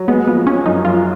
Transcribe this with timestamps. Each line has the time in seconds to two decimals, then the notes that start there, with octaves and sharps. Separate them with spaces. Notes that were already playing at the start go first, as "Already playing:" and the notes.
Already playing: F#3
0.08 G#3 B3
0.27 F3 B3
0.47 F3 C#4
0.66 F#2 D#4
0.85 F#2 F4